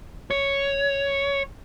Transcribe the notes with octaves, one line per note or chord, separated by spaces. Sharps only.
C#5